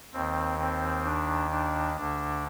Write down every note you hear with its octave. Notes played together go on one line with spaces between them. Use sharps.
D#2 D#3 C4
C4
D4
D4
D2 D3 D4